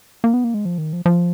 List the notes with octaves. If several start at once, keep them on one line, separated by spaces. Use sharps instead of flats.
A#3
B3
A#3
G#3
F3
D#3
F3
F3